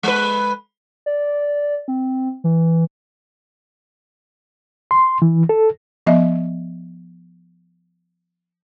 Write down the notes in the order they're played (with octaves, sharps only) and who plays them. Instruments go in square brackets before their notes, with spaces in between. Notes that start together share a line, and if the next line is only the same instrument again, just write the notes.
[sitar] G#3 B4
[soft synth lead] D5
C4
E3
[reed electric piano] C6
E3
A4
[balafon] F3 B3 D#5 E5